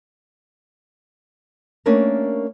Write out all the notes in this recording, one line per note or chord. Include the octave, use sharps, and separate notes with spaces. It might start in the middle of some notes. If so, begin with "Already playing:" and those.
A3 A#3 C#4 D4 G4 A#4